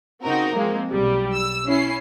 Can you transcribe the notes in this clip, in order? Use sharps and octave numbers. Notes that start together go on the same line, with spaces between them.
C#3 C4 D#4 F#4 A#4
F3 G#3 A#3 C4
B1 G3
E6
C#4 E4 C7